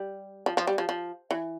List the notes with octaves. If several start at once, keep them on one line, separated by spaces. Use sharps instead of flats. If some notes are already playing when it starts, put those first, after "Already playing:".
Already playing: G3
F3
F3
G3
F3
F3
E3